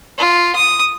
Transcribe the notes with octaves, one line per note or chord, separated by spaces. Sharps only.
F4
D#6